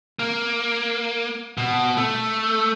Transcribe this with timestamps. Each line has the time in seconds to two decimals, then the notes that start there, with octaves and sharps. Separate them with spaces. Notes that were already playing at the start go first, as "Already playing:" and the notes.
0.19 A#3
1.58 B2
1.97 A3